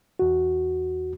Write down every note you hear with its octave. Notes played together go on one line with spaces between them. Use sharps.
E2 F#4